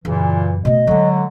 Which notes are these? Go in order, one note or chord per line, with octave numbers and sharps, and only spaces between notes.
F#2 A#2 C#3 E3
B2 A3 D#5
D3 F#3 G#3 C#4